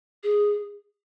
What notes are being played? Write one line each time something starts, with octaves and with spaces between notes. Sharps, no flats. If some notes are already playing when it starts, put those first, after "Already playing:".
G#4